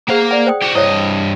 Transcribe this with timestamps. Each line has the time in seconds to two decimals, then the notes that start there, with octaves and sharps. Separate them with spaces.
0.09 A#3 G#4 C5 F5 F#5
0.31 D5 F#5
0.47 C5 G5 D#6
0.62 F#4 G4
0.75 G2 E4 C5 C#5 D#5